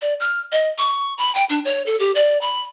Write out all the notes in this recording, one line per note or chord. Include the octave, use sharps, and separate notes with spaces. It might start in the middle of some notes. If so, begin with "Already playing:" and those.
D5
F6
D#5
C#6
B5
G5
D4
C#5
A4
G4
D5
B5